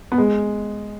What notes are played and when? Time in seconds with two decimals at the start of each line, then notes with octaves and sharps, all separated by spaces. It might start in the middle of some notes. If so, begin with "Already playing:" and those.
0.12 B3
0.18 G#3